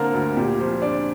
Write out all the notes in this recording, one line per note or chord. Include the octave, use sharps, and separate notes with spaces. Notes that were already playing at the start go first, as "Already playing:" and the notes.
Already playing: D3 A#3 D4 A#4 C5 D5
D2
A#2 G4
F3 C5
D4 D5